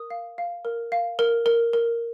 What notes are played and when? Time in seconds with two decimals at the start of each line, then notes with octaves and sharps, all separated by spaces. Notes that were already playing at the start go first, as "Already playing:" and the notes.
Already playing: A#4 D#6
0.10 F5
0.38 F5
0.65 A#4
0.92 F5
1.19 A#4
1.46 A#4
1.73 A#4